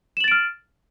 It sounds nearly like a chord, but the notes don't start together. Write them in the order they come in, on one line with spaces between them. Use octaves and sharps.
E7 F#7 A6 D7 F6